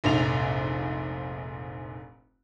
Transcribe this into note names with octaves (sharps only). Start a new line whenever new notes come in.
F1 A#1 G#2 F7